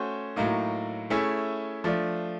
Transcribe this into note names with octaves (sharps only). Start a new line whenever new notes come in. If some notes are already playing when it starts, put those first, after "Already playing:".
Already playing: A3 C#4 F#4 C5
A2 F#3 A#3 D#4
A3 C#4 E4 G#4
F3 A3 D4